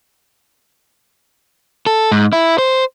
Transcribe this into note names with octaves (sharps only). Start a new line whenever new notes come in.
A4
G#2
E4
C5